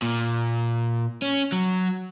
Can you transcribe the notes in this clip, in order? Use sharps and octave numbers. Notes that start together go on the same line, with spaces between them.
A#2
C#4
F#3